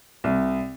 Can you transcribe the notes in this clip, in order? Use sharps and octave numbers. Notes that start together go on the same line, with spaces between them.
C2